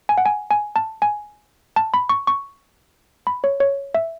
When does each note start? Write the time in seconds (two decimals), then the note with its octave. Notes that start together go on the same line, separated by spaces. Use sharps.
0.09 G#5
0.18 F#5
0.26 G#5
0.51 G#5
0.76 A5
1.02 G#5
1.76 A5
1.94 B5
2.09 C#6
2.27 C#6
3.27 B5
3.44 C#5
3.60 C#5
3.95 E5